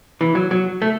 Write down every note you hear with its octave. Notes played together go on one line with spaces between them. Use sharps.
E3
F#3
F#3
A3